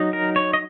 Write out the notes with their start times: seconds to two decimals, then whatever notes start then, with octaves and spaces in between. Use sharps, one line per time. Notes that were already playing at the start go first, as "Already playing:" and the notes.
Already playing: F#3 D#4
0.13 A#4
0.36 C#5
0.53 D#5